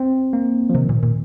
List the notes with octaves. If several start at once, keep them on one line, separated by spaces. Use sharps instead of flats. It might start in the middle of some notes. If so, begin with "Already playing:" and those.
Already playing: C4
A#3
F3
C3 D#3
A#2
A#2